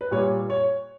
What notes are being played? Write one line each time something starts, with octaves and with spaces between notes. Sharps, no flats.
B4
A#2 G3 C#5
C#5